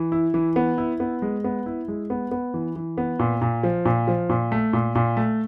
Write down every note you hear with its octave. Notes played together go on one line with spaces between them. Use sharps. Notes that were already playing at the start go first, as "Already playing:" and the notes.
Already playing: E3
E4
E3
B3
E4
B3
G#3
B3
E4
G#3
B3
B3
E3
E3
B3
A#2
A#2
F3
A#2
F3
A#2
A3
A#2
A#2
A3